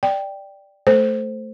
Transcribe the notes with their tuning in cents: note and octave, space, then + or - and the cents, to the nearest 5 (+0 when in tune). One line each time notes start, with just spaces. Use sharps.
D5 +0 G5 +0
A3 +0 A4 +0 C5 +0